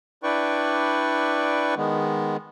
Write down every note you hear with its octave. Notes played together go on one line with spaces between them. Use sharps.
D4 E4 B4 D5 G5 C#6
D#3 G#3 B3